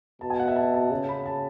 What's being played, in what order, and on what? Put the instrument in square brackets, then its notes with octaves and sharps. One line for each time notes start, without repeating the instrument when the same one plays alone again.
[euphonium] B2 [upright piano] A5
[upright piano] G#5
F#5
E5
A5
A5
[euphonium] C#3 [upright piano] A5
[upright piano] B5
A5